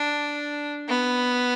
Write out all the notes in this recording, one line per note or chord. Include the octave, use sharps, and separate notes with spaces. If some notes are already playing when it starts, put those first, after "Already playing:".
Already playing: D4
B3